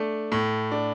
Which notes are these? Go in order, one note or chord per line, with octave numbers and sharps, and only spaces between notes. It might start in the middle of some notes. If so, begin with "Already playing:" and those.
Already playing: A3 D4
A2
D4